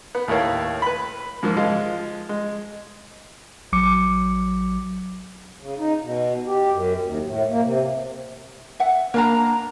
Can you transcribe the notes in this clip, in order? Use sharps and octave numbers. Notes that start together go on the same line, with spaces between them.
B3
D#2 A2 A#4 C#5 F5
B4 B5
G#2 F3 A#3
F3 G#3 F5
G#3
A1 F#3 D6 C#7
C#3
D#4
B2
G4
F#2
D#2
A2
A#3
C3
E5 F#5
A#3 D4 A#4 F5 A#5 B5